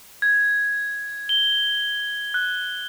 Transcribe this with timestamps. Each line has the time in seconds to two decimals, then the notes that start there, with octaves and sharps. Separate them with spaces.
0.22 G#6
1.29 G7
2.34 F#6